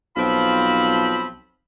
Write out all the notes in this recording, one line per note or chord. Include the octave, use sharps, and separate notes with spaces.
B1 F3 C4 B5